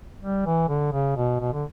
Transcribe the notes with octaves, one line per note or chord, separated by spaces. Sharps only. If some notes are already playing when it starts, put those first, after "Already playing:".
G3
E3
D3
C#3
B2
B2
D3